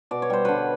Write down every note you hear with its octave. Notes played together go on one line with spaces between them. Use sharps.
B2 D5
C#5
G3 C5
D3 B4 C#5